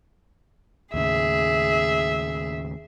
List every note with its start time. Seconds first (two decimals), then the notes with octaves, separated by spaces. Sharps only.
0.94 D#2 A2 C#3 G#4 E5